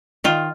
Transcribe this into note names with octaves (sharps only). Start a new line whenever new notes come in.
D#3 F4